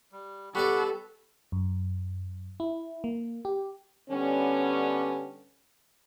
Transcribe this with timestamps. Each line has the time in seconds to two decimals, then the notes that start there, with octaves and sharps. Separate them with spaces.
0.12 G3
0.55 G3 B3 A4 D5 F#5 B5 C#6
1.52 F#2
2.60 E4
3.04 A#3
3.45 G4
4.10 D3 G3 B3 C#4